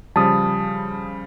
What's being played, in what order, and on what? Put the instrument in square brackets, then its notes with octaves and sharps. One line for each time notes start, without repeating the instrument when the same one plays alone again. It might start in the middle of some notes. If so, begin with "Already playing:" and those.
[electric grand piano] C#3 F3 G3 [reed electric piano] A5 D#6